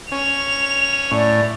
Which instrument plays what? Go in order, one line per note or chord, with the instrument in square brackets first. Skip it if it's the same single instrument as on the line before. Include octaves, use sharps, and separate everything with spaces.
[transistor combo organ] C#4 [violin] F7
[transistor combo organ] A2 [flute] D5